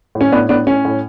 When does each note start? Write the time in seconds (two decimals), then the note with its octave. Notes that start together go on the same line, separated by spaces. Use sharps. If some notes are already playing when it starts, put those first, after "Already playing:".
0.15 A2
0.21 C#4
0.32 A2 B3 D4
0.49 A2 B3 D4
0.67 A2 C#4
0.85 A2